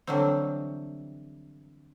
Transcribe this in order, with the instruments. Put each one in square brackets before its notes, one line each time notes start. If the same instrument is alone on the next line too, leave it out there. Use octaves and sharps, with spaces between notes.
[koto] D3 E3 F#3 G3 C4